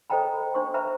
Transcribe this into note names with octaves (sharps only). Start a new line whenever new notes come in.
A4 C5 D#5 G5 A#5 B5
D4 C5 C6 C#6
B4 C5 E5 A#5 B5